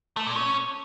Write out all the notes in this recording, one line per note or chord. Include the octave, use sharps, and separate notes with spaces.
A3
A#2
C#4